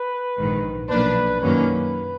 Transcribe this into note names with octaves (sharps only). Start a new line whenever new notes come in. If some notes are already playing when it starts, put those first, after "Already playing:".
Already playing: B4
A#1 G#2 D#3
B1 A#2 F3 A#3 D4 B4
F#2 D#3 F#3 A#3 C#4 B4